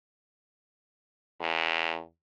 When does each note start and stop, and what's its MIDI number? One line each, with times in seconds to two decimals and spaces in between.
1.41 2.01 40